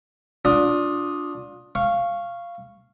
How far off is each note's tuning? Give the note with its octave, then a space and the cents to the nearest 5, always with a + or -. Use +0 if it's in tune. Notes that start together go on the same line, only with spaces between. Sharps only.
D4 -5 F4 +30 D#6 +0
F5 -10 C#6 -5